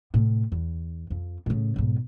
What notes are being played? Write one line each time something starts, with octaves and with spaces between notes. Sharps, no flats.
A2 C3
E2
F2
A2 C#3
B1 G#2